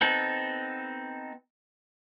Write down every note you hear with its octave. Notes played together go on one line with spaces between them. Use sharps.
B3 C4 D#4 A4